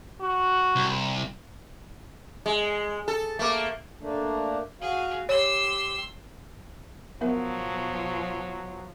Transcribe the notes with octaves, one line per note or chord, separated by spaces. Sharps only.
F#4
C2
G#3
A4
A3 A#3
A3 A#3 D4
F#4 G#4 F5
G4 C#5 C6 E6
B2 F3 F#3 B3 A#4 E5